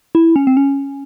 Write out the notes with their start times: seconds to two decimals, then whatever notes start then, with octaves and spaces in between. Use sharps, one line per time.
0.15 E4
0.36 C#4
0.47 C4
0.57 C#4